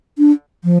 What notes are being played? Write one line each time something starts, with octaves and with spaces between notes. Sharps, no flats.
D4
F3